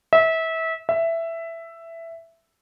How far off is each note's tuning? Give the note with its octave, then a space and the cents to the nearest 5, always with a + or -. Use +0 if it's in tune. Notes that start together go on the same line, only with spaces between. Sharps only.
E5 -25
E5 +10